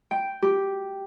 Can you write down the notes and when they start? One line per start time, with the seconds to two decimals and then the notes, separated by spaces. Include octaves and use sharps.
0.11 G5
0.42 G4